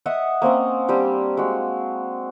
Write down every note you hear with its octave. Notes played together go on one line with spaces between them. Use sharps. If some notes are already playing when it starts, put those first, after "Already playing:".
D#5 E5 F#5 D#6
A#3 C4 C#4 D#5
G3 C4 D4 G4
G#3 F#4